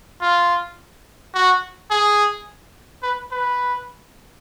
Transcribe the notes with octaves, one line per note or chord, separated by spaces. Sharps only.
F4
F#4
G#4
B4
B4